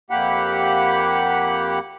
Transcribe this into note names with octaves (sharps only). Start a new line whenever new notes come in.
F2 A#3 G4 F#5 B5